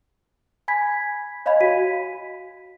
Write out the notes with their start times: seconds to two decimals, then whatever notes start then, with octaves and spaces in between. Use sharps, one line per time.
0.68 G#5 B5 G#6 B6
1.46 C#5 D#5 F5 G#5 B5 G#6
1.61 F#4 B6 D#7